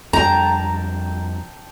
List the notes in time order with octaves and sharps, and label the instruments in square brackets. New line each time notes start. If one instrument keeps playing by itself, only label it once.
[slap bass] F2 G3 D4 [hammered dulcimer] G5 A5 [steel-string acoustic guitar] A#5